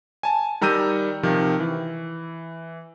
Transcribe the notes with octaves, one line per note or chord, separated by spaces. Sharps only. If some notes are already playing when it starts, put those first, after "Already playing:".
G#5 A5
D#3 G3 A#5 E6 G6 D#7
C3 D#3 F3
E3